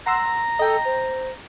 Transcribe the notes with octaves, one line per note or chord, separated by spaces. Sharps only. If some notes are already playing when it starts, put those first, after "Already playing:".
F#5 A#5 C6 E6
A4 D#5 G5
C5